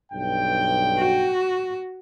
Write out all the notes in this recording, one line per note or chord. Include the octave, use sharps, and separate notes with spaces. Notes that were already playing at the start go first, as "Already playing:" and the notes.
B1 G2 G5
F#4